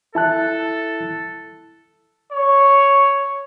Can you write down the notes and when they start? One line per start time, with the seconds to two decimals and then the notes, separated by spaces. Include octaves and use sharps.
0.15 E4 A4 A5 F#6
2.32 C#5